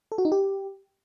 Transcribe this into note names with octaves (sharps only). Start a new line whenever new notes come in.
A4
F#4
D#4
G4